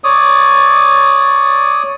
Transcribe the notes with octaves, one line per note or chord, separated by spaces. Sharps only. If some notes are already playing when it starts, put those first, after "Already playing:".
C#5 D5 D#6